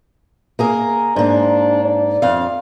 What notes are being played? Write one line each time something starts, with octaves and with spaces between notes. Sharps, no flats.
A#3 G#4 A#4
G#2 A#3 D4
D5
F2 F5